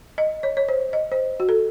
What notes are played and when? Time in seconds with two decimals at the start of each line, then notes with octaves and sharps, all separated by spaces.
0.18 D#5
0.43 C#5
0.57 C#5
0.69 C5
0.93 D#5
1.11 C5
1.40 F#4
1.49 A4